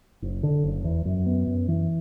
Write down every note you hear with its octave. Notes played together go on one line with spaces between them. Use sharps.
F#1
D3
F#1
E2
F#2
B3
F#2
E3